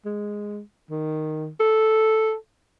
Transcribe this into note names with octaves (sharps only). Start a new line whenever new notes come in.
G#3
D#3
A4